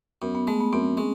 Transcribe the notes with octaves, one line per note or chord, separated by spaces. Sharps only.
F#2 B3
B3
G#3 A3
B3
F#2 C4
G#3 C#4